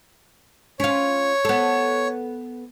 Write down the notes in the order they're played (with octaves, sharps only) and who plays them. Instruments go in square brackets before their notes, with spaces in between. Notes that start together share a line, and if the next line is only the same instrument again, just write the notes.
[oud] C#4 F4 [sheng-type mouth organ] C#5
[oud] B3 A4